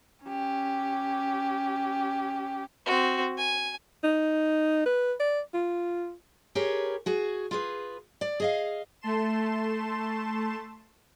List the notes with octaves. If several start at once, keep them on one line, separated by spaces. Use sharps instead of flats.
C#4 G4
C4 F#4
G#5
D#4
B4
D5
F4
G4 G#4 A#4 B4 C#5
F#4 G#4
F4 G#4 B4
D5
G#4 D#5 F5
A3 A5 C6 E7